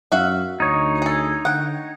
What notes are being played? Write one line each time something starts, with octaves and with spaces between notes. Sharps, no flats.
F#2 F#4 E5 F5
D2 D#4 C#5
G#4 A4
D3 F#5 G5